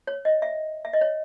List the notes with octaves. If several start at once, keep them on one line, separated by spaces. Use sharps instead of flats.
C#5
D#5
E5
E5
D#5
C#5